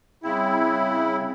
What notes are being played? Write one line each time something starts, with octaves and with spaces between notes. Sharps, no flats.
C#3 G3 C4 E4 G5